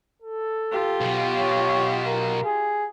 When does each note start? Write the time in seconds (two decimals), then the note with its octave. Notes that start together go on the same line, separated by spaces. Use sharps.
0.22 A4
0.72 F4 G4
1.01 B1 B2
1.37 C#5
2.06 A#4
2.44 G#4